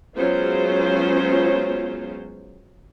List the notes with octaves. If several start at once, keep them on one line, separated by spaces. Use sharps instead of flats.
F#3 G#3 B3 C#4 F4 C5